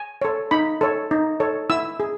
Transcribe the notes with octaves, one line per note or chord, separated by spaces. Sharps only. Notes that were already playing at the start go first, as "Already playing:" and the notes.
Already playing: G#5
A4 C#5
D#4 B5
A4 C#5
D#4
A4 C#5
E4 E6
G#4